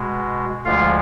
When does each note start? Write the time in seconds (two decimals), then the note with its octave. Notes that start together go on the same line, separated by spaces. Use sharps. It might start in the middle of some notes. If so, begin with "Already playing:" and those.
Already playing: B2 G#3
0.65 D2 D3 F3 G#3 F4 F5